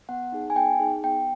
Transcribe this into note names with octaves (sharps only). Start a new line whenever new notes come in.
B3 F#5
D#4 G#4
G#5
B3 G5
D#4 G#4
B3 G5